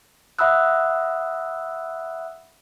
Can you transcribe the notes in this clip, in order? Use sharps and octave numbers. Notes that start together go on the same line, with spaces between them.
E5 F#5 B5 D#6 E6 F#6